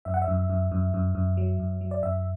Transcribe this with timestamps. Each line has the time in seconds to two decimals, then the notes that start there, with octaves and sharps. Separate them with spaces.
0.05 F#2 E5
0.14 F#5
0.22 E5
0.28 F#2
0.50 F#2
0.72 F#2
0.94 F#2
1.15 F#2
1.37 F#3
1.60 F#2
1.81 F#3
1.91 D5
2.03 F#2 E5